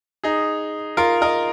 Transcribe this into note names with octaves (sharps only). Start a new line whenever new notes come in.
D#4 G#4
F4 A#4
A#4 D#5